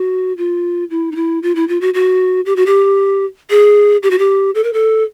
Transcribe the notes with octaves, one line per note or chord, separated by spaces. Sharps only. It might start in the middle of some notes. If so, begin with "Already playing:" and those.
Already playing: F#4
F4
E4
D#4
E4
F4
E4
F4
F#4
F#4
G4
F#4
G4
G#4
G4
F#4
G4
A4
A#4
A4